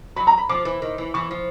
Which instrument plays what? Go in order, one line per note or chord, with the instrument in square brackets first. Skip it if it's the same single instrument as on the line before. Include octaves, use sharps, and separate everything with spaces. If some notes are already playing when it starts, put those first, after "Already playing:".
[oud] F#3 [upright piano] B5
[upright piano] A#5
B5
[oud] F3 [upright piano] D6
[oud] E3
D#3
E3
[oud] E3 [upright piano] C#6
[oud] F3